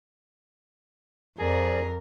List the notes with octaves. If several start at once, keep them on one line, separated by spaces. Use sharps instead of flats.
F2 F3 G#4 A#4 D5